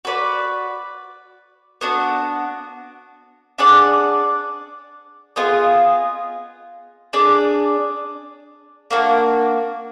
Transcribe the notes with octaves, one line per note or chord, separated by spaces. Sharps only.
F#4 B4 D5
B3 D4 F#4
D4 G#4 D5 F#5
B3 F4 G#4 D#5
D4 G#4 D5
A#3 D4 F#4